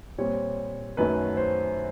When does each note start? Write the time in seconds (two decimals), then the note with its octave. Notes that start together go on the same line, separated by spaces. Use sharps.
0.18 A#2 G3 C4 C#5
0.97 F#2 D#3 F#3 A3 C#4 B4
1.37 C5